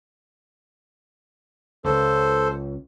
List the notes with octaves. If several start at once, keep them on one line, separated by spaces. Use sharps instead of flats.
C#2 A4 C5